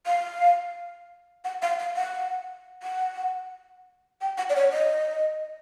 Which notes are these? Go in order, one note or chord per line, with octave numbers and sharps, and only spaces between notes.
F5
F#5
F5
F5
F#5
F#5
G5
F#5
D5
C#5
D#5